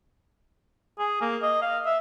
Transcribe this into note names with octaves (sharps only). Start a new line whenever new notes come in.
G#4
A#3
D#5
F5
E5